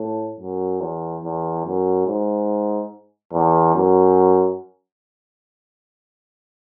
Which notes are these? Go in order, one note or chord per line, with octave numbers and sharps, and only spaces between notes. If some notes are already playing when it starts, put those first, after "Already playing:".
Already playing: A2
F#2
E2
E2
F#2
G#2
E2
F#2